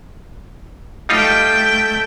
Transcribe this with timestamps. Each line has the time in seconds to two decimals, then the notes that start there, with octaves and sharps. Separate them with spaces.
1.09 G3 A3 D#4 F4 G5